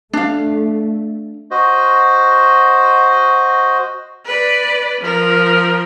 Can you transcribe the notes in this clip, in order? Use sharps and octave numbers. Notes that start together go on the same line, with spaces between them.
A3 D4 F5
F#4 C5 D#5
B4 D5
F3 A#4